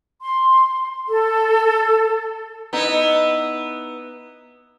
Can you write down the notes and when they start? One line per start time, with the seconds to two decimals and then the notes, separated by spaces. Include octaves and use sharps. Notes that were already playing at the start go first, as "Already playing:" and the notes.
0.21 C6
1.06 A4
2.73 B3 D#4 E4